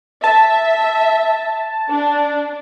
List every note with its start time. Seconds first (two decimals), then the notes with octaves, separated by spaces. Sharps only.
0.24 E5 A5
1.90 D4